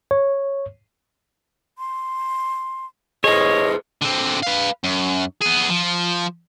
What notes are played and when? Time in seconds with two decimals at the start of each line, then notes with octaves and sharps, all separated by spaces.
0.11 C#5
1.78 C6
3.24 G#4 A4 C5 C#5 D#5
4.02 D3 C4
4.43 B4 F5
4.84 F#2
5.42 B3 G#4
5.69 F3